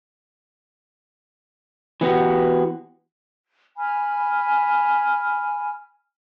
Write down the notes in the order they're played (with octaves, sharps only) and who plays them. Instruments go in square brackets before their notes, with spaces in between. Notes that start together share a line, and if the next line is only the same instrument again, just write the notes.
[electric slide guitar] E3 B3 F#4 G4
[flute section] G#5 B5 F6